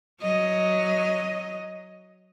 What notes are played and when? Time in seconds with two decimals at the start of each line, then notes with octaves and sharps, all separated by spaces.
0.21 F#3 D#5